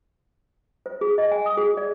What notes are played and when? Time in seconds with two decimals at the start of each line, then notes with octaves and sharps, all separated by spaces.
0.86 C5
1.01 G#4
1.18 D#5
1.31 G#5
1.46 D#6
1.57 G#4
1.77 D5